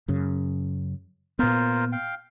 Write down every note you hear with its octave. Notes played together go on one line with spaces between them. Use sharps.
F#2 C#3
A#2 B3 F4 A#4 C5
F5 G5